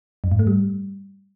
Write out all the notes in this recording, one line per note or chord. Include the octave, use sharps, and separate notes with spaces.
F#2
G#2
A3
G3